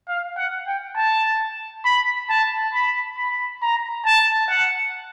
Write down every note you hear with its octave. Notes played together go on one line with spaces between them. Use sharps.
F5
F#5
G5
A5
B5
A5
B5
B5
A#5
A5
F#5